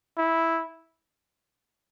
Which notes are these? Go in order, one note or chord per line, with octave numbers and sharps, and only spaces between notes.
E4